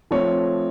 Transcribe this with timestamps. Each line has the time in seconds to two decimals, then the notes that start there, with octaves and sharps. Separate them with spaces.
0.11 F3 A3 C4 C#5